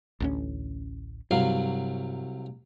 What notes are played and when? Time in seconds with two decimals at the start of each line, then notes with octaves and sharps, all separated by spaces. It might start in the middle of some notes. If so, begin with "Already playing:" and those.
0.20 A1 D2 C#4
1.31 C2 G2 F#3 F5